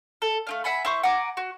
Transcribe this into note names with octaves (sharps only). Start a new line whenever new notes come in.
A4
A3 C4 F5
E5 F#5 G#5 B5
E4 C5 C#6
F#5 G#5 A#5 D6
F#4